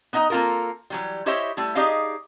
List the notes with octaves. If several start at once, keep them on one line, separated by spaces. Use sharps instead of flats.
B3 D#4 D#5 E5 A#5
A#3 C4 F4 A4 A#4
E3 F#3 G3
E4 G4 C5 C#5 D#5 E5
G3 A3 E4
D#4 G4 G#4 D5 D#5 F5